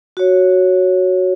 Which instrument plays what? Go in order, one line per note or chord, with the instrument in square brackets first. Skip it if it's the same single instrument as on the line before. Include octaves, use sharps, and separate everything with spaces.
[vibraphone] F#4 C#5